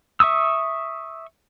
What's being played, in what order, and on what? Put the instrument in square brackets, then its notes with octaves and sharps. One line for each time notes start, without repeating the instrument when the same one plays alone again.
[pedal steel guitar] E5 C#6 D#6 E6